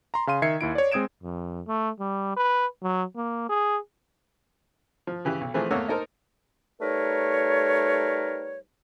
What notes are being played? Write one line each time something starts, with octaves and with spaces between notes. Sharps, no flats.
A#5 C6
C#3 F5 C6 D#7
D#3 E5 G#6 C7 C#7
D#2 E4 D7
C#5 D5
G#3 C4 D#6 G#6 D7 E7
F2
A3
G3
B4
F#3
A#3
G#4
F3
C#3 E3 G4
B1
E3 F3 A3 C4 G#4
E2 A3 A#3 C#5 F#5 E6
D#4 A4 A#4 C5
G3 A3 D#4 A#4 B4 C#5